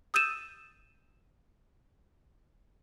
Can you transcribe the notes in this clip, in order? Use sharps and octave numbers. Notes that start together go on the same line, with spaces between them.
D#6 E6 G6 A6 D#7 E7